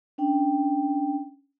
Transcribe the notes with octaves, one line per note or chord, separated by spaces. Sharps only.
C#4 D4 G5